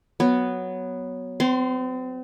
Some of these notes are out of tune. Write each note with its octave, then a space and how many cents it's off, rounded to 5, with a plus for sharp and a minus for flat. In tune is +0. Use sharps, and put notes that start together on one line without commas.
F#3 +0 B3 +0
C4 -40 C6 +0